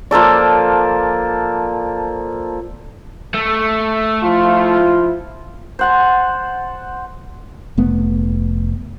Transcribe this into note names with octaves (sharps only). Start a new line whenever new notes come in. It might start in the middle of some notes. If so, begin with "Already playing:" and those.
F3 A#3 A4 D5
A3
F3 E4 F4
C5 F#5 A5
F1 A3 B3